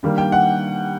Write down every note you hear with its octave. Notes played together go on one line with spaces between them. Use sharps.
D#3 G3 A#3 D4
G5
F#5